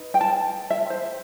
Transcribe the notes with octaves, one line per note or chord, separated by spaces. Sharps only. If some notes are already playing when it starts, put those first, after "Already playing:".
Already playing: D#4 B4
G5
A5
E5
C5